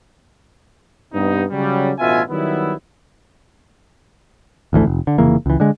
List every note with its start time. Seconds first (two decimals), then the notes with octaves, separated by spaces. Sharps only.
1.13 G2 C3 B3 D#4
1.50 C#3 F#3 G3
1.99 A1 D2 B2 F4 E5 G#5
2.29 D#3 F#3 G3 B3 E4
4.73 G#1 D2 E3 A3
4.86 F1
5.07 D3
5.18 F1 C#3 E3 A#3
5.46 C#2 E3
5.60 D3 G#3